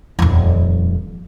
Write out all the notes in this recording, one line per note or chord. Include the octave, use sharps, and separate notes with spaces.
D#1 F2